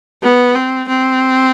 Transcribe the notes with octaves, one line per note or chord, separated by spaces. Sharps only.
B3
C4
C4